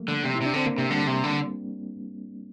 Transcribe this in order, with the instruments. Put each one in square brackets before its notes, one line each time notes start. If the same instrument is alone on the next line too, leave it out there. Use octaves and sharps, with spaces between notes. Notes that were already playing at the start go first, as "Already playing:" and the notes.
Already playing: [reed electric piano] F3 G3 A3 A#3
[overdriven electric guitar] D3
C3
[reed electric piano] E4
[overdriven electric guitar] C3 [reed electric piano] D4
[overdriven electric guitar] D3 [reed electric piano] C4
[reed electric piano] A#3
[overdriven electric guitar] C3
[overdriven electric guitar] D3 [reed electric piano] G3
[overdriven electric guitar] C3
D3